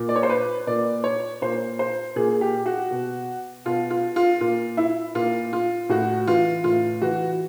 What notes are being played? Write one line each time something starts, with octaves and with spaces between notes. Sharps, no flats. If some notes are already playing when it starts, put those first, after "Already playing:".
Already playing: A#2
D5
C#5
C5
B4
A#2 D5
C#5
A#2 C5
C5
A#2 G#4
G4
F#4
B2
B2 F4
F4
F4
A#2 F4
E4
A#2 F4
F4
A2 F#4
E3 F4
A2 F4
E3 F#4